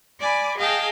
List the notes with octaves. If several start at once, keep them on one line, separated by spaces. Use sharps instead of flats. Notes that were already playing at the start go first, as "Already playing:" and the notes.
D5 G#5 B5 D6
G#4 D#5 F5 G5 A5